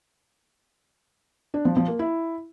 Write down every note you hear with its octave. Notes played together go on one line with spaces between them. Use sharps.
D4
F3
F3
A#3
E4